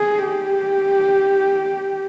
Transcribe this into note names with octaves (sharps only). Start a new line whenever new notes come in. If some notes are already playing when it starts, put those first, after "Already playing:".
Already playing: G#4
G4